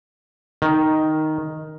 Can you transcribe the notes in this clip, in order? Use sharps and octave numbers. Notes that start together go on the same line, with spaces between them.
D#3